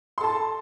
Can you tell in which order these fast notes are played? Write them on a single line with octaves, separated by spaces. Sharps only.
C6 A4 A5